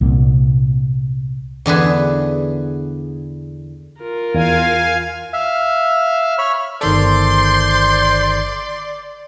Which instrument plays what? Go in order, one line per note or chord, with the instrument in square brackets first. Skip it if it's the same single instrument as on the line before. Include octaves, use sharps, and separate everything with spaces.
[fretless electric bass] C2 A#2
[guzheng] E2 D3 G#4 B4
[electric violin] F4 A#4
[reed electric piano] E2 [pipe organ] F5 G#5
[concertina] E5 F5
C#5 B5 F6
[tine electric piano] G1 D#3 A4 [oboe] C5 [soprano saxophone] D5 [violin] C6